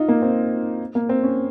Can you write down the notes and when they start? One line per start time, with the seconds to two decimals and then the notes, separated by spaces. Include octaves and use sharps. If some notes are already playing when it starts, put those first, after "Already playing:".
Already playing: D#4 F4
0.08 A#3
0.22 C4
0.95 A#3
1.09 C4
1.23 C#4